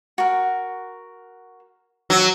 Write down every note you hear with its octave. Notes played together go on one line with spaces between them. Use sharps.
F#4 A#4
F#3